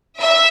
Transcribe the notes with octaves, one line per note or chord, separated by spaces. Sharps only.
E5